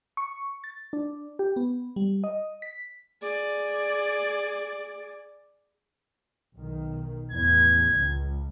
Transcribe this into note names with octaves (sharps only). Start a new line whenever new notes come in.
C#6
A6
D4
G4
B3
G3
D#5
B6
G#4 D5
B1 D#3
A1 E2 G#6
C#2